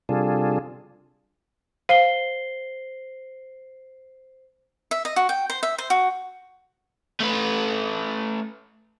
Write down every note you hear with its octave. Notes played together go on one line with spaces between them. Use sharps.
C3 G3 D4 F4 G#4 A4
C5 F5 C7 G7
E5
D#5
F#4
G5
C5
E5
C5
F#4
A3 B4